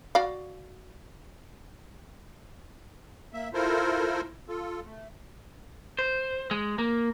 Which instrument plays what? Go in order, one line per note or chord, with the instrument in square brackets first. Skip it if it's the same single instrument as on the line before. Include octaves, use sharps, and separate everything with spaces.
[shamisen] F#4 D5 F5
[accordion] A#3 E5
E4 F4 A4 A#4 C5
F4 A4
A3
[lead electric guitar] C5
G#3
A#3